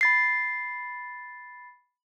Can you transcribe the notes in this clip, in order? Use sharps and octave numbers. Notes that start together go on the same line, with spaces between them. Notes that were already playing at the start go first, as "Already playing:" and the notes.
B5 A6 C7